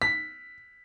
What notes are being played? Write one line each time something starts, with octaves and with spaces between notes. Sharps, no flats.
B6